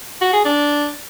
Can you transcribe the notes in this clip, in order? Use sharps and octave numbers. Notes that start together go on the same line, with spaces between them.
F#4
G#4
D4